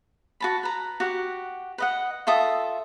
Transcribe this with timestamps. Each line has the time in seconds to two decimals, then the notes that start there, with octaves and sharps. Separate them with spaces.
0.40 F#4 A5 B5
0.63 B4 A#5
1.00 F#4 G4 F#5
1.78 B4 D#5 F#5
2.27 F4 A4 E5 D#6